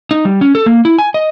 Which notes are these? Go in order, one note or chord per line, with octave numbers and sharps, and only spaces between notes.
D#4
G3
C#4
A4
A#3
E4
G#5
D#5